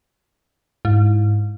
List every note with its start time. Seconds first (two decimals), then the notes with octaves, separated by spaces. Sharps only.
0.85 G#2 E4